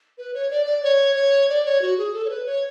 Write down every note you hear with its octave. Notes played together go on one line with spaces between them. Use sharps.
B4
C#5
D5
D5
C#5
C#5
D5
C#5
F#4
G#4
A4
C#5
B4
C#5